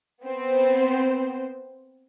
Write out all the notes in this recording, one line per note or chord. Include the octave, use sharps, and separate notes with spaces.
B3 C4 C5